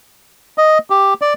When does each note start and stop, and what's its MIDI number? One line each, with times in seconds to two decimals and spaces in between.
0.58 0.78 75
0.90 1.14 67
1.22 1.34 74